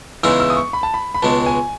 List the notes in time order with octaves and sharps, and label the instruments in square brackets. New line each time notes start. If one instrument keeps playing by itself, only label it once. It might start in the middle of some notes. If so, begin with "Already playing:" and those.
[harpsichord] E2 C#3 E3 G#3 D#4 [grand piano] E6
[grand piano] E6
D#6
C#6
B5
A5
B5
B5
[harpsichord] C#2 B2 G#3 [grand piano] A5
[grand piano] G#5